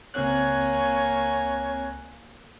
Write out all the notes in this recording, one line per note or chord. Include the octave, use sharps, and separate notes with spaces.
C#2 A#3 C4 C#5 G#5 F#6